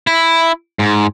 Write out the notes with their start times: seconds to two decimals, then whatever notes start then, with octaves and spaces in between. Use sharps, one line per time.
0.07 E4
0.79 G#2